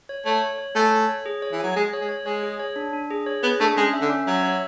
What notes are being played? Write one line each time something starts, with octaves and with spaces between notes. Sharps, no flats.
C#5
A3 C#5
C#5
C#5
A3 G#5
C#5
C#5
G#4
C#5
E3
F#3 G#5
G#3 G#4
C#5
G#3
C#5
G#3 C#5
G#4
C#5
D4
D4
G#4
C#5
B3 G#4
A3 D4
G#3 C#4
E5
D3
C#4
F#3 E5
C#5